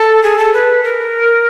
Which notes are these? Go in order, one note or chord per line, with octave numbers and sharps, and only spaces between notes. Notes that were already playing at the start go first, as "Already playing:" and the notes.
Already playing: A4
G#4
A4
B4
A#4